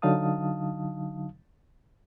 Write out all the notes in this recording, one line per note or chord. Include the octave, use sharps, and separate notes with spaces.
D3 F#3 D#4 F5 A5 D#6